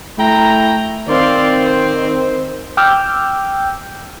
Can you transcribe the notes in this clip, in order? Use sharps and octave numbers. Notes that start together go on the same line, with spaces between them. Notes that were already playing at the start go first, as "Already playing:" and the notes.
A3 E4 G5 A#5
D#3 C4 D5 F5 C6
C5
G5 D6 E6 F6 G6